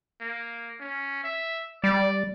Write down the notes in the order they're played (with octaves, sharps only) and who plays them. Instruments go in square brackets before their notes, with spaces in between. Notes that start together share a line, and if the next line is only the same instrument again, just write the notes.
[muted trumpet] A#3
C#4
E5
[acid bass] G3 [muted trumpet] D5